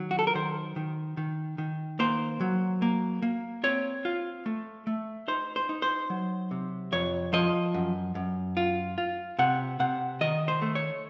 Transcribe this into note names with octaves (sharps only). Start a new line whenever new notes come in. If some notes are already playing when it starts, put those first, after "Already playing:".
Already playing: D#3 F#3
F#4
A4
A#4
D#3 C5
D#3
D#3
D#3
A#3 C5
F#3
A#3
A#3
C4 C#5
F4
A3
A3
D#4 C5
C5
D#4
C5
F#3
C3
F2 C#5
F3 D#5
F#2
F#2
F4
F4
C3 F#5
C3 F#5
D#3 D#5
C5
A3
C#5